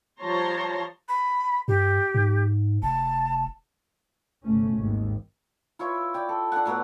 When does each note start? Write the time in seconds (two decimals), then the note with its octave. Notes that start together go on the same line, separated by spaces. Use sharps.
0.22 F3 G3 C#5 A5 A#5 C6
1.08 B5
1.68 G2 G4
2.15 G#2
2.83 F1 A5
4.44 G1 C3 A3 C#4
4.76 G#1 D#2
5.79 E4 F4 C#5 E5
6.14 D5 G5
6.29 A4
6.52 D4 A4 F#5
6.66 A2 F#3 B3 D5